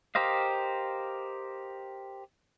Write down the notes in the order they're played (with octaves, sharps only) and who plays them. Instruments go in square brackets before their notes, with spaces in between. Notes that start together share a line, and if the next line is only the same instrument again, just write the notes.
[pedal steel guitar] G4 A#4 C5 D#5 F5